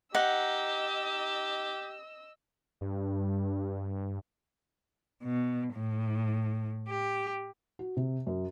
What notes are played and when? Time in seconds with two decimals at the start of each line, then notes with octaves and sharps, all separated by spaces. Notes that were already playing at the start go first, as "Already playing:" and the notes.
0.15 D#4 G4 D#5 F#5 E6
2.81 G2
5.24 B2
5.74 A2
6.88 G4
7.79 F#4
7.97 C3
8.27 F#2